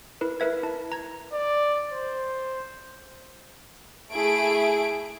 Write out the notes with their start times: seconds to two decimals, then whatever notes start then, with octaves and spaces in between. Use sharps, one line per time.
0.21 E4 A#4 B4
0.40 A#4 B4 E5 G#6
0.63 E4 A5
0.92 A#5 G#6
1.33 D5
1.93 C5
4.13 A3 E4 G#4 D7